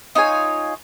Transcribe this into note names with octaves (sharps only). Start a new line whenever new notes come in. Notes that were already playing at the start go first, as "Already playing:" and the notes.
D#4 F4 C#5 G#5